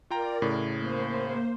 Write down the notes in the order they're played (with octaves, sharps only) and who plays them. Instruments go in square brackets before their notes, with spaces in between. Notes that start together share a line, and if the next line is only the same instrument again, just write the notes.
[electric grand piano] F4 G5 A#5 [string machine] A#4 D5
[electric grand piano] A2 C#3
[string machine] A#3 C5